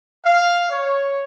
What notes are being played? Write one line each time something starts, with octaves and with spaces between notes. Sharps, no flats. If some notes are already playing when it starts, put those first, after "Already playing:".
F5
C#5